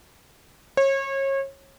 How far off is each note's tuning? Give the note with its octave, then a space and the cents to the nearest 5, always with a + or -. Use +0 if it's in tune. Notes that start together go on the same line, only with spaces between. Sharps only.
C#5 -30